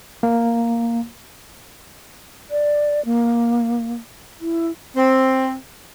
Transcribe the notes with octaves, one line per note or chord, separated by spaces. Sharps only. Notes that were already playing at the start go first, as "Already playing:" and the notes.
A#3
D5
A#3
E4
C4